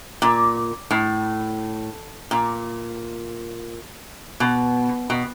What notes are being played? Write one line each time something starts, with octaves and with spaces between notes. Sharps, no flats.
A#2
A2
A#2
B2
B2